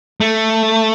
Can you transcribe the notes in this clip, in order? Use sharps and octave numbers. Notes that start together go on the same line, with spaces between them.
A3